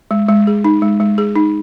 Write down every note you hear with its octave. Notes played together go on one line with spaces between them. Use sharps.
G#3
G#3
G#4
D#4
G#3
G#3
G#4
D#4